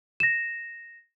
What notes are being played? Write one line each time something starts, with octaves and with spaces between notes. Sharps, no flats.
A#6 E7